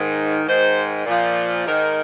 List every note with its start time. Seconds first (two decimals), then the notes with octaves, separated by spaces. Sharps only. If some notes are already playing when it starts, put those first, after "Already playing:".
Already playing: G#2 D#3
0.44 G#2 D#3 C5
1.06 A#2 F3
1.65 G#2 D#3 A#4